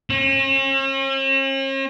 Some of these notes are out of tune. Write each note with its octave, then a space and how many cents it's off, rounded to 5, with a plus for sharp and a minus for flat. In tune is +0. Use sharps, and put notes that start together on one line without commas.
C#4 -45